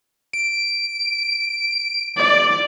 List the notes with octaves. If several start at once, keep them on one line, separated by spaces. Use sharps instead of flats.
D7
D5